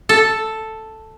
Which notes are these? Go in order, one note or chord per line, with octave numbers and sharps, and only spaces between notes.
A4